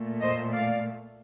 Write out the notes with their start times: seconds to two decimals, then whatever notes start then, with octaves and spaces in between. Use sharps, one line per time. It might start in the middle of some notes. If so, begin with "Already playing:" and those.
Already playing: A#2 A3
0.21 C5 D#5
0.51 D5 F5